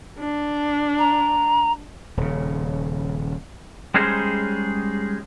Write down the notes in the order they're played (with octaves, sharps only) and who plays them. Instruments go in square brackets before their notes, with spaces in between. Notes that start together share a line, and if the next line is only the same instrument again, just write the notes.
[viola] D4
[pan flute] A#5
[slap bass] D#1 C#3
[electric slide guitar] G3 G#3 C#4 D#4 G#4 C5